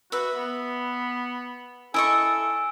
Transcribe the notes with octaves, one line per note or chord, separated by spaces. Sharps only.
F#4 B4 E5
B3
E4 A4 D#5 G#5 C#6 E6 D7